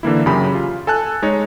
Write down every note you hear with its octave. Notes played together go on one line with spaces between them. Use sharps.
D3 E3 A#3 E4
F#2 C#3 C#4 G4 B5
F4
A4 G#5 A5 F#6
G#3 D#4 C#5